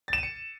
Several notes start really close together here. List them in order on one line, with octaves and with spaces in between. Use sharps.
A6 E7 D#7 C#7